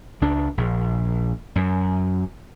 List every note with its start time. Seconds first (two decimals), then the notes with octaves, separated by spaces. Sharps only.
0.21 C#2 D4
0.58 A#1
1.56 F#2